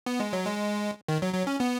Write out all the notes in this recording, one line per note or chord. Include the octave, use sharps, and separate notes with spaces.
B3
G#3
F#3
G#3
D#3
F#3
F#3
C#4
B3